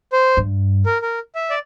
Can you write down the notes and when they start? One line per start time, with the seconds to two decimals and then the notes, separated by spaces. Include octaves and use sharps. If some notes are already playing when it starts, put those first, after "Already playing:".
0.13 C5
0.37 G2
0.86 A#4
1.02 A#4
1.35 E5
1.50 D5